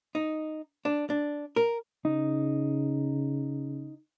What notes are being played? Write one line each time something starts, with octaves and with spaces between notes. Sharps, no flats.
D#4
D4
D4
A#4
C#3 D#4